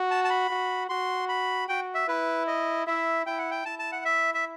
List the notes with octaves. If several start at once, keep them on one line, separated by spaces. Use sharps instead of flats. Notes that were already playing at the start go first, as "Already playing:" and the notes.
Already playing: F#4
A5
A5
B5
F#4
F#4 C6
B5
F#4 G5
E5
E4 B4
D#5
E4 E5
E4 G5
F#5
G5
E4 A5
A5
F#5
E5
E5